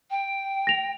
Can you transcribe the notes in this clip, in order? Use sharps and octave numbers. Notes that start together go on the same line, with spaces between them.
G5
A#6 F7